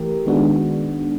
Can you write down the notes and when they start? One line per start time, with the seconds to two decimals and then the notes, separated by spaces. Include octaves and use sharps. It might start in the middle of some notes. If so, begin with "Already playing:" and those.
Already playing: E3 A3 G4 A#4
0.26 D#3 G#3 B3 D4 F#4